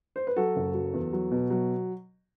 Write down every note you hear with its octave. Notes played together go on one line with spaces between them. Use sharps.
C5
B4
F#3 F#4 A4
F#1
F#3
E2
F#3
B2
F#3